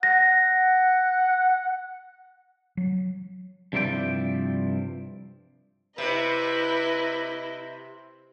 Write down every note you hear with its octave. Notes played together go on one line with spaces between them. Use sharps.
F#5 A#6
F#3
G2 C3 F3 E4 D5 G5
C3 E4 B4 D#5